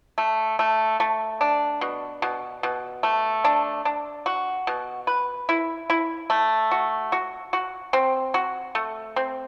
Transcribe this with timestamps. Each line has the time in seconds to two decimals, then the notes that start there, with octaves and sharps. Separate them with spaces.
0.18 A3
0.59 A3
1.00 A3
1.41 D4
1.81 B2
2.22 B2
2.63 B2
3.03 A3
3.44 D4
3.85 D4
4.26 F#4
4.67 B2
5.07 B4
5.49 E4
5.90 E4
6.30 A3
6.71 F#4
7.12 F#4
7.53 F#4
7.93 C4
8.34 F#4
8.75 A3
9.16 C4